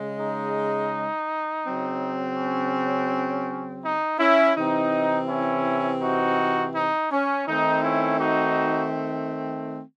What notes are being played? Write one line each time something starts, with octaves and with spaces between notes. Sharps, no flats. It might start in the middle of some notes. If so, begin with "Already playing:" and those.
Already playing: C#3 G#3
D#4
C#3 F#3 C4
C#4
D#4
C#4 E4
C3 E3 C4 D#4
C#4 E4
D#4 F#4
D#4
C#4
D#3 A3 C4 D#4
C#4 E4
D#4 F#4